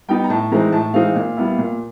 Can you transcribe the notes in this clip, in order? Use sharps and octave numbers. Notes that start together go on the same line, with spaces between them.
G3 B3 D#4 G5
A#5
A2 A5
E3 G#3 C4 D#4 A#5
A2 A5
E3 G#3 C4 D#4 F5
A#2
G3 B3 E4
A#2